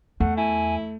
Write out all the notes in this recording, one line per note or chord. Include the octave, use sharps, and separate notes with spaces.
E2 A3 F#5
E4 G#5